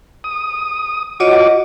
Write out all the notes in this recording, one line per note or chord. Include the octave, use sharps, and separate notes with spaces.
D#6
F4 F#4 C#5 D#5 D6